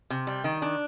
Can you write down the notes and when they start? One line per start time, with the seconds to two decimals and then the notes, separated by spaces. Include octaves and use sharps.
0.10 C3
0.27 G3
0.44 D#3
0.62 D4